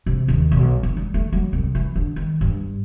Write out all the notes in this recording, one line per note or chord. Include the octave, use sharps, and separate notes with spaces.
C3
D#2
B1
D3
G3
A3
F#3
C2
E3
D3
D#3
G2